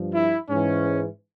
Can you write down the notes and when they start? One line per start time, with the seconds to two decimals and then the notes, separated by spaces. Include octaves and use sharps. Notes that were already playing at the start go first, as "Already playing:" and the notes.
Already playing: G2 F3
0.13 E4
0.49 G#2 E3 C#4